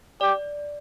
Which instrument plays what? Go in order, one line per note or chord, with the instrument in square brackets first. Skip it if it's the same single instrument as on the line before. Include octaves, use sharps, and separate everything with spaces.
[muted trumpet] G4 [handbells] D5